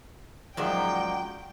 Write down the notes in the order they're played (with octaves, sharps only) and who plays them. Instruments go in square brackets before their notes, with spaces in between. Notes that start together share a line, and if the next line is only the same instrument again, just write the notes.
[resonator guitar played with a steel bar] F#2 A#2 D#3 [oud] F3 F#3 G#3 [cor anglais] D5 [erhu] G5